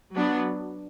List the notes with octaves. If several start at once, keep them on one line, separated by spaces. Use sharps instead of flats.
F#3 B3 D4